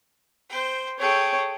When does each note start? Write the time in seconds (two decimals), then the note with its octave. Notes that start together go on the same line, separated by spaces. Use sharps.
0.50 C5 G5
0.99 G#4 A4 C#5 G5